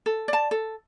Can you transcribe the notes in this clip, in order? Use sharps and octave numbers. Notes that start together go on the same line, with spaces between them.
A4
D5 A5
A4